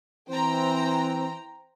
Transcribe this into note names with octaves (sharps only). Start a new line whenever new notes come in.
E3 C4 C5 G5 A#5